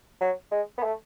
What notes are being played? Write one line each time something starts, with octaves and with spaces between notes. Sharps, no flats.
F#3
G#3
B3
A3